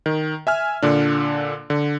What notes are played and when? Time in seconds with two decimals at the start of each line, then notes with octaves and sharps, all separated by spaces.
0.06 D#3
0.47 E5 G#5 F6
0.82 A#2 D3 D4
1.70 D3